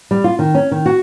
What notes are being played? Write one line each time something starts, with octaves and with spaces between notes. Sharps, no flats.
G3
F4
D#3
C#4
D#3
F#4